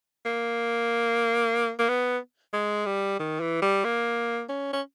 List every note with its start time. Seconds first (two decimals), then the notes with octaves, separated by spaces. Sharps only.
0.25 A#3
1.79 A#3
1.89 B3
2.53 G#3
2.86 G3
3.19 D#3
3.40 E3
3.62 G3
3.84 A#3
4.49 C#4
4.73 C#4